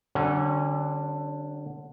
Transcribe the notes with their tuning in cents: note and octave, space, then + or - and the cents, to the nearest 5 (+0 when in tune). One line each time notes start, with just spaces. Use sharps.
D3 +5 G3 -45 C#4 -20